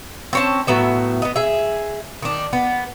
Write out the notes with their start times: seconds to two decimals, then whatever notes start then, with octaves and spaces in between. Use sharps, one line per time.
0.33 C4 C#4 A5
0.67 A2 F#3 B3 E5
1.22 B3 D#5
1.36 G#4 E5
2.22 D#3 D4
2.53 B3